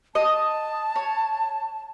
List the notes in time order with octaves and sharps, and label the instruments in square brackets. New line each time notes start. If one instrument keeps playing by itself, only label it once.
[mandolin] D#5 [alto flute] A5
[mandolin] C#5